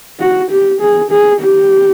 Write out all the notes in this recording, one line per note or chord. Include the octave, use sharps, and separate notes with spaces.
F#4
G4
G#4
G#4
G4